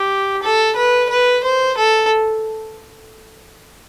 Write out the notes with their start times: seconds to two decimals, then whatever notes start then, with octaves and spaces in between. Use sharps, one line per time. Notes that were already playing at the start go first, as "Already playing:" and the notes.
Already playing: G4
0.43 A4
0.76 B4
1.10 B4
1.44 C5
1.78 A4